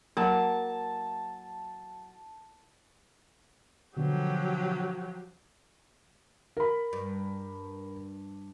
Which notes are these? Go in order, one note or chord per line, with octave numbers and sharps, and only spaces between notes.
F#3 A#3 A5
B2 D3 F3 F#3 G4
A#4 B5
G2